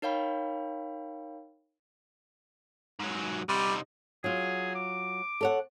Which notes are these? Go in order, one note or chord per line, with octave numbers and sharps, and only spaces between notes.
D#4 A#4 C#5 F5 G5 B5
G#2 F#3
C3 G3 D#4
F#3 F4 G#4
D6
A4 C#5 F#5